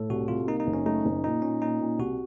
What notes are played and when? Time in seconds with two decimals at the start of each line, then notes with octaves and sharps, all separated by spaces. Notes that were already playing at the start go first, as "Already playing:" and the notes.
Already playing: A2 A4
0.09 C2 F#4
0.28 C2 F4
0.47 A#3 D#4
0.60 D#4
0.67 F#1
0.73 C#4
0.86 A3 D#4
1.05 F#1
1.24 A#2 D#4
1.42 A#2 C#4
1.61 A#2 D#4
1.80 A#2
1.99 C2 F#4